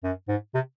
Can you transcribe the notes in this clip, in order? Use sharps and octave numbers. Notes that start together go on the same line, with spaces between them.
F#2
G#2
C3